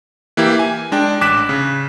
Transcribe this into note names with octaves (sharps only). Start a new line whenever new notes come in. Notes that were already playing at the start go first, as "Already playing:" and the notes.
E3 A#3 E4 G4
G#5
G#3 D4 G5
A1 D6 F#6 B6 E7
C#3